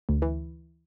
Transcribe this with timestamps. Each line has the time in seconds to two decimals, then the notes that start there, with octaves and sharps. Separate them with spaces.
0.09 D2
0.22 E3